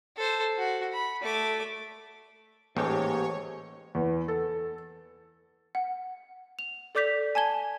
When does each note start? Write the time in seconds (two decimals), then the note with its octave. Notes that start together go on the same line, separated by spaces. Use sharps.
0.17 A4 C5
0.58 F#4
0.93 B5
1.22 A3 D6
2.77 A1 G#2 A#3 G4 C#5 D6
3.95 E2
4.28 A4
5.75 F#5
6.59 F7
6.95 A4 D5 D6 G6 B6 F7
7.35 G#5 A5 G#6 G7